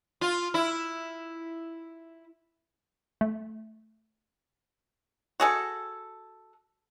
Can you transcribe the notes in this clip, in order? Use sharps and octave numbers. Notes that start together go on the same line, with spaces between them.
F4
E4
A3
F#4 G#4 A4